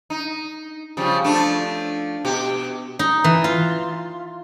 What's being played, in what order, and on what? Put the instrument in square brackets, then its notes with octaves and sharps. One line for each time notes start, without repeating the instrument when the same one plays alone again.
[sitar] D#4
C#3 F3 G3
F3 A3 D4
B2 G4
[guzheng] D#4
E3
F4